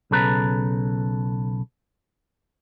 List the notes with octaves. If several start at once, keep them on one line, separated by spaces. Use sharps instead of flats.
B1 C#3 A4 B4 A#5